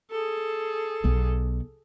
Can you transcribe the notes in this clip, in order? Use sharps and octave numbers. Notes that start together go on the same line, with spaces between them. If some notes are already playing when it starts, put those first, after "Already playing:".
G#4 A4
B1 B3